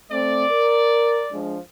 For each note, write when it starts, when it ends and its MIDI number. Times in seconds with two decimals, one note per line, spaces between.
0.11 0.45 57
0.11 0.45 60
0.11 1.39 74
0.51 1.23 70
1.32 1.58 53
1.32 1.58 56
1.32 1.58 62